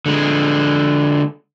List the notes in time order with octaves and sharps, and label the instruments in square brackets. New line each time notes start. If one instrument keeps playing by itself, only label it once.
[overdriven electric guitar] D3 G#3